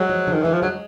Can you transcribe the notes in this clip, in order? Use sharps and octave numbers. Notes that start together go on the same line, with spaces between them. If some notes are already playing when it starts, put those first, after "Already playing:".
Already playing: F#3 G#3
F3
D3
D#3
E3 G#3
F3
F#3 G#3